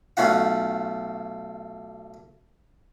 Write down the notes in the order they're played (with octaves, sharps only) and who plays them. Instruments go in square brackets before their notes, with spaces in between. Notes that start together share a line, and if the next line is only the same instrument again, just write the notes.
[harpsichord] B1 A3 C#4 F4 F#5